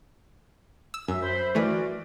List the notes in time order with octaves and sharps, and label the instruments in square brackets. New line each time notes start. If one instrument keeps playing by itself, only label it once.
[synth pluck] E6
[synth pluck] F#2 [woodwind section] E5
[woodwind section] C5 B5
[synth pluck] E3 A3 [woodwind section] F#4 A#4 D5